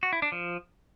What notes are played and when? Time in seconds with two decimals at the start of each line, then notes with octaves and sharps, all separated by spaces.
0.03 F#4
0.13 E4
0.22 D4
0.32 F3